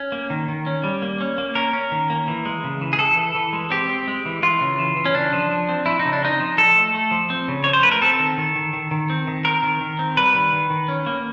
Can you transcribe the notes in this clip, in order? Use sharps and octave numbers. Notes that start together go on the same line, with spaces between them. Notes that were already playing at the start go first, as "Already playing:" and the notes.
Already playing: C#4
A#3
D#3
D#3
C#4
G3
A#3
C#4
A#3
C#4 A#4
C#4
D#3
A#3
E3
G#3
C#3
E3
G#4
E3 A4
E3
E3
G#3
C4 G4
C4
G#3
E3
E3 F4
C#3
E3
E3
C#4
C#3 D4
F3
F3
C4
F3 E4
D#4
C#3
D4
C4 D#4
F3
F3 A4
A3
A3
F3
C4
C#3
F3 C#5
C5
A3 B4
A#4
C4 A4
D#3
D#3
D#3
D#3
D#3
C4
D#3
C4 A#4
D#3
D#3
C4
G3 B4
D#3
D#3
D#3
C#4
A#3